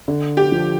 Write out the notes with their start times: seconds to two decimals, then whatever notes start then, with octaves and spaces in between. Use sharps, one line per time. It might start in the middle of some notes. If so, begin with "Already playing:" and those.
0.08 D3
0.37 G4
0.52 F3